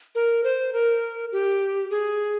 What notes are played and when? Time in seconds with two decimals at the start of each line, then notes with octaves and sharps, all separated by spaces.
0.15 A#4
0.44 C5
0.73 A#4
1.32 G4
1.90 G#4